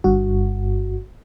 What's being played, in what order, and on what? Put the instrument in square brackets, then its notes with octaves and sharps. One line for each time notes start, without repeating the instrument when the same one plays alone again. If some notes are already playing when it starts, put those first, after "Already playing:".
[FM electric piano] G1 G2 F#4